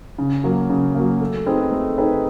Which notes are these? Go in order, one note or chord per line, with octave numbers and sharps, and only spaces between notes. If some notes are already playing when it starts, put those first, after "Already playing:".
C#3
F#3 A#3
C#3
F#3 A#3
A3
C4 D#4 G#4 B4
A3
C4 D#4 G#4 B4